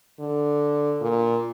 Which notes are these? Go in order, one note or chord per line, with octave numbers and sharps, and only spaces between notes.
D3
A#2